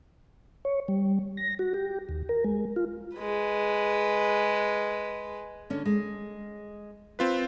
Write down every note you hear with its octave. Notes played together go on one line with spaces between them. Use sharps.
C#5
G3
A#6
F#4
G4
D#2
A#4
G#3
F4
G#3 B4
D3 C#4
G#3
C4 F4 B4